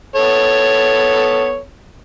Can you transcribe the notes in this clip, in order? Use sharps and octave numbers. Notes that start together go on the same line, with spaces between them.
B3 A4 C#5